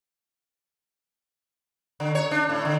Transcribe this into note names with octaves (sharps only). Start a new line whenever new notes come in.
D3
C#5
D4
A2
D3